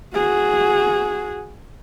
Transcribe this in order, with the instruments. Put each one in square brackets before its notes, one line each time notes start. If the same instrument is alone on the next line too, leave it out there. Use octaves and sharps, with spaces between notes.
[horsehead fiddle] F#4 G#4